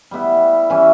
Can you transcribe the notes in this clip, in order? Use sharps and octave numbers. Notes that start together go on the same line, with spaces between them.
G3 B3 E4
E3 G3 C#4